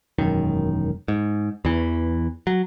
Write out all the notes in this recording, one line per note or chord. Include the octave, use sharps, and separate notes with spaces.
E1 F#2 D#3
G#2
E2 E3
F#3